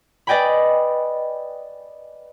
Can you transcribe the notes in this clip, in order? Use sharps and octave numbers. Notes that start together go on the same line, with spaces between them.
B4 D5 D#5 G5 G#5 B5